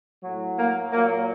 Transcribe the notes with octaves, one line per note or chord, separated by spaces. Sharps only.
A2 F#3
A#3
A#2 F#3 A#3